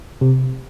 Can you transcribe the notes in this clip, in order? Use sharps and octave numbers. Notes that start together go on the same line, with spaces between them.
C3